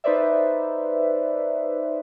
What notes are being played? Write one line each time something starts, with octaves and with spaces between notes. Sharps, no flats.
D#4 B4 C5 D5 E5